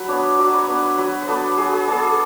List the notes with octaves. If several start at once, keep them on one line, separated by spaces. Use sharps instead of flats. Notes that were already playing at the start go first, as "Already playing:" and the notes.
Already playing: F#3 B4
B3 D4 C#5
F#3 D5
B4
C#5
B3 D4
B4
F#3 B4
B4
B3 D4 A4
F#3 G#4
G#4
B3 D4 G#4
A4